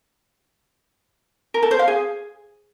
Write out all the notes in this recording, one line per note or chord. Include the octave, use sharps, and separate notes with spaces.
A#4
A4
C5
F5
G#4